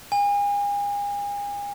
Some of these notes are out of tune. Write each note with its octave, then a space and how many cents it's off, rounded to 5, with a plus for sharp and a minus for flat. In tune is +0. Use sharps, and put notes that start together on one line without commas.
G#5 -40